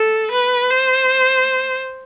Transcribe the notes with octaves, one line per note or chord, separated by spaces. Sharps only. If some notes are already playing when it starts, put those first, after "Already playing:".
Already playing: A4
B4
C5